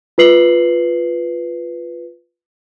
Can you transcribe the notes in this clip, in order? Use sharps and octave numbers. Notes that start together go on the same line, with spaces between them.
F4 B4 C7 F#7